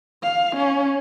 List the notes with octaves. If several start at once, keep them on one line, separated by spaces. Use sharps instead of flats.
F5
C#4